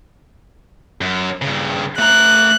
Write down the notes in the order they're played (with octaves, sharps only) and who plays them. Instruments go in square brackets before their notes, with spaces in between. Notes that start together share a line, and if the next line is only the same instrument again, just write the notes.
[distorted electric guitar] F#2
G2 C#3
[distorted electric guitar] A3 A#5 [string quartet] F#6